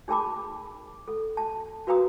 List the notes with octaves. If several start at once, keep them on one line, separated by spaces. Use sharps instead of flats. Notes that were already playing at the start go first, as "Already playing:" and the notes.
D#4 G#4 A#4 A5 B5 D6
A4
A5
F#4 A#4 B4 F5 A#5 D#6